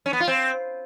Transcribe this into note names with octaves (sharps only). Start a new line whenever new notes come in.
C#4
B3
F4
C4